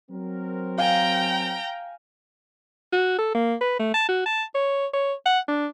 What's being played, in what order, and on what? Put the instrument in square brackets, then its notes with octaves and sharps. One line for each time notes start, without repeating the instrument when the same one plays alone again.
[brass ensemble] F#3 C4 A#4
[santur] F5 G#5 [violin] G5 A#5
[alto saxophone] F#4
A4
A#3
B4
A3
A5
F#4
A5
C#5
C#5
F#5
D4